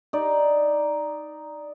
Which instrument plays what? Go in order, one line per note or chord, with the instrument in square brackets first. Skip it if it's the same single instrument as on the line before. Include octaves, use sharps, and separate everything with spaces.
[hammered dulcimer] D#4 D5